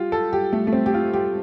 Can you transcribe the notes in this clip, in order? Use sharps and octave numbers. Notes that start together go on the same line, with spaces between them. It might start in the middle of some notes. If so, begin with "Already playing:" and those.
Already playing: F4 G4
A4
G4
A3
A3
C4
G4
F4
G4